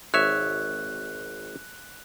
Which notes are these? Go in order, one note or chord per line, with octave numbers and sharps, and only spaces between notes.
G#1 C#5 E5 F#6